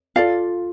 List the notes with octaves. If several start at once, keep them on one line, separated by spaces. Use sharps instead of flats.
F4 A4 D5 F5